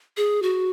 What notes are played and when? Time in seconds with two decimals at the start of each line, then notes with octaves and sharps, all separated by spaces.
0.17 G#4
0.42 F#4